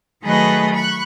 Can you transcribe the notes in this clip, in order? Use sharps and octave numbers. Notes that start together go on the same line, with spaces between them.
D#3 F#3 A3 G#4 B4 D#5
B5 C#6 F#6